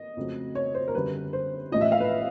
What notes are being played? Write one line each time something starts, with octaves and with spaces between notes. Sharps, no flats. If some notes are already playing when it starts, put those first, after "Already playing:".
Already playing: D#5
F2 C#3 F#3 A3
C#5
C5
A#4
F#2 D3 G3 B4
C5
A1 A2 F3 D#5
E5
F5
B4